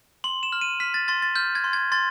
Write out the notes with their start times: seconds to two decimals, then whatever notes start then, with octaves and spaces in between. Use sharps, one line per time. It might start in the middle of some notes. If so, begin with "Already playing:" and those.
0.24 C6 F#7
0.43 E7
0.52 F6
0.61 D#7
0.80 F6 B6
0.94 A6
1.08 C6 A6
1.22 A6
1.35 F6 G6
1.55 G#6
1.64 C6
1.73 G#6
1.92 C6 A6